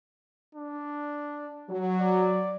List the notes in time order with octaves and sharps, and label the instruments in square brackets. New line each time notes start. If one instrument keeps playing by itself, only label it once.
[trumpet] D4
[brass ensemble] F#3
[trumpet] D5